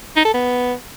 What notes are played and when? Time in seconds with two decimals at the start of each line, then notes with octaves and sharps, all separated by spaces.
0.16 D#4
0.25 A4
0.34 B3